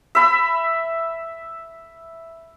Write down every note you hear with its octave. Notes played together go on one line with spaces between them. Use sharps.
E5 B5